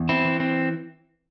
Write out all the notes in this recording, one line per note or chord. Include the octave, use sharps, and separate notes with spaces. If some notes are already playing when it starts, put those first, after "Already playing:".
Already playing: E2
C4 E4
E3
C4